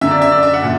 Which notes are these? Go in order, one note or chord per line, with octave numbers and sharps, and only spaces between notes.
F#2 D3 E5
D5
E5
D5
E5
F#5
A#2